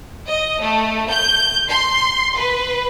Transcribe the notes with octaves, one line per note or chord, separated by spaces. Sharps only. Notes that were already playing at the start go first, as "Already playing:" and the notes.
D#5
A3
G6
C6
B4